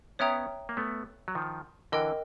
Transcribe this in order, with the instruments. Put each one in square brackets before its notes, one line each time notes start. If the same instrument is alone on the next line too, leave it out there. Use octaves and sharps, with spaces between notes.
[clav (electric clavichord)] B3 C#4 [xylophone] C#5 E5 G5 A#5 D#6
[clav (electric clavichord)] A#3
A3 B3
F#3
D#3 F3
[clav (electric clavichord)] D3 E3 [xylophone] A#4 D#5 G5